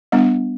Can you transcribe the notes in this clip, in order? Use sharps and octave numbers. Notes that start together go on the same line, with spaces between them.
G3 B3 D4